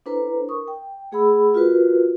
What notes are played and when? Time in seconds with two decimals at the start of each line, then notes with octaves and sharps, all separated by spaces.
0.06 D4 E4 A4 B4 C5 A#5
0.49 A#4 C#6 D#6
0.68 G5
1.12 A3 G#4 F#5 B5 E6
1.54 F4 F#4 A#4 B4